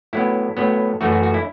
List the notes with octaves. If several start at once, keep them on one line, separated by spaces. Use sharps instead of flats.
A2 F#3 B3 E4
A2 F#3 B3
F#2 E3 A3 F#4
F#4
F#4
E4